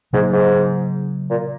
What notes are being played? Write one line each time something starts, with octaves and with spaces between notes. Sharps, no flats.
G#2 C#3 F#3 A#3
G#2
A#2